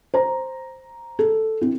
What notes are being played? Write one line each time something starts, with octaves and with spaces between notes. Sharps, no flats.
C5 A#5
A4
C4 E4